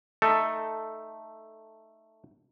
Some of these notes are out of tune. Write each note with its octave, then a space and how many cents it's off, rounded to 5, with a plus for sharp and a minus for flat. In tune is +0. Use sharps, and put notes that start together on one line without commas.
A3 +0 D#4 +0 A4 +5